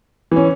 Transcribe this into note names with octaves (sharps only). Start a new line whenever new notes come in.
E3 C#4